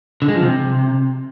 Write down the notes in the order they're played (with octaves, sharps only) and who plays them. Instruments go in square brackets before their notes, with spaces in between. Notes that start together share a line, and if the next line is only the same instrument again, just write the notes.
[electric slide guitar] D3
G#3
F3
C3